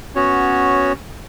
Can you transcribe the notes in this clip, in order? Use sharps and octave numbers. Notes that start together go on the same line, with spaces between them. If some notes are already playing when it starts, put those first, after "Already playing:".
B3 C#4 F#4 C#5